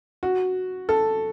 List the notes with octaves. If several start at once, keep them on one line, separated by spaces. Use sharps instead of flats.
F#4
A4